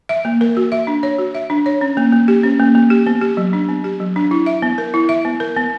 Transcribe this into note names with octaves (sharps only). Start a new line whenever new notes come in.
E5
A#3
A#4
F#4
E5
D4
C#5
F#4
E5
D4
C#5
C#4
A#3
A#3
G4
C#4
A#3
A#3
G4
B3
G4
F#3
D4
B3
G4
F#3
D4
E4
E5
B3
A#4
E4
E5
B3
A#4
B3